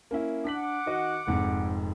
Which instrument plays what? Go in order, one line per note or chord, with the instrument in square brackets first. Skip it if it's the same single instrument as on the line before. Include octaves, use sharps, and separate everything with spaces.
[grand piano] A#3 C#4 E4
[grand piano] D4 B6 F#7 [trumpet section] F#5 D6
[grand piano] D#3 F#4 D#5
F1 F2 G#2